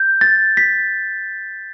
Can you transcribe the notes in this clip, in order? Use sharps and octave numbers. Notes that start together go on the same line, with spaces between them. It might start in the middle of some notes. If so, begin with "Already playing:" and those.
Already playing: G6
A6
B6